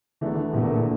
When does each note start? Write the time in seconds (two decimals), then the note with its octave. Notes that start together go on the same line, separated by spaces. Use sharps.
0.21 E1 E2 E3 A3 D4
0.52 E1 E2 A#2 E3 A3 D4